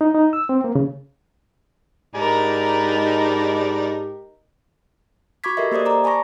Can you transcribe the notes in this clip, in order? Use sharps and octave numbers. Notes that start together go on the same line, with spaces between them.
D#4
D#4
E6
C4
A#3
C#3
G#2 D#4 G4 A#4 D5 A5 B5
F#4 B5 C#6 D6 G#6 B6
G4 A4 A#4 D#5 E5
A#3 G4 C5 D5 D#6
D5 A#5 D6
G#5 A5 B5 C#6 A#6